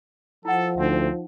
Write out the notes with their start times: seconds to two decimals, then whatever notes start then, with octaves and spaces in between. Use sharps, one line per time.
0.45 F3 E4 A4 F#5
0.78 D2 C4 D#4 E5